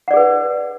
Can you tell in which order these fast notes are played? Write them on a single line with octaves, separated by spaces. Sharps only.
F#5 D5 G#4 B4